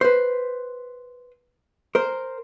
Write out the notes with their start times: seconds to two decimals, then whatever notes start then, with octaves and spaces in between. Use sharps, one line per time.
0.01 B4 C5
1.95 A#4 C5